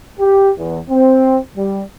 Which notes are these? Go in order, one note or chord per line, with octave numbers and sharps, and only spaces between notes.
G4
E2
C4
G3